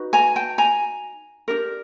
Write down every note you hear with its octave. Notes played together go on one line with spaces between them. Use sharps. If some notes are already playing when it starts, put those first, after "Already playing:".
Already playing: D#4 F#4 B4
G#5 A#5
G5 A5
G#5 A#5
D4 G4 A#4